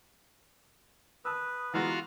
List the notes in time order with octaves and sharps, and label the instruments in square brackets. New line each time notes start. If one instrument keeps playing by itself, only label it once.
[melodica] B4 [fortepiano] A5 E6 [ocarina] D#6
[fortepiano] E3 G#3 B3 [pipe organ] F4 F#4 F5 [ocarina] A#5